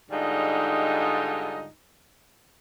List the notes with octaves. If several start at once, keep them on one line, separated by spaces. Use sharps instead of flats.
G#2 D3 G3 D#4 F4 D#5